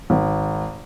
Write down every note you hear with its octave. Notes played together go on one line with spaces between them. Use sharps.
G#1